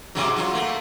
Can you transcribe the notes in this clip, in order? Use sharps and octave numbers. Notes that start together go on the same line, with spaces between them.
G#2 C3 F#3
F#3 F4
A3 A#3